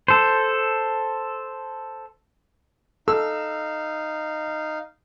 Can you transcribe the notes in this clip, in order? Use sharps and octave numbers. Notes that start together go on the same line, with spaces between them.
A4 C5
D#4 A4 F5 E6